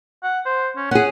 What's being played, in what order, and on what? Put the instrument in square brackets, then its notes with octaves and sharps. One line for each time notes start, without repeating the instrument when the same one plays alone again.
[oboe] F#5
C5
C#4
[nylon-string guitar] C#4 G#4 [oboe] F#5